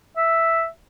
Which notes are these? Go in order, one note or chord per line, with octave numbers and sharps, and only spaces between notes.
E5